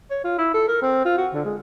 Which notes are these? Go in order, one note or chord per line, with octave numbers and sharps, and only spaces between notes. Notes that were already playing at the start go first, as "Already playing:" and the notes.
C#5
F4
E4
A4
A#4
C4
F4
F#4
D3
G#3